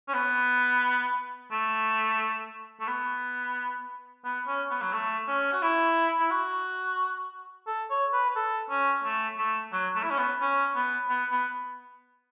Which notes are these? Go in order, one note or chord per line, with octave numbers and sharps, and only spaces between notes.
C#4
B3
A3
A3
B3
B3
C#4
B3
F#3
A3
C#4
F#4
E4
E4
F#4
A4
C#5
B4
B4
A4
C#4
A3
A3
F#3
A3
E4
C#4
B3
C#4
B3
B3
B3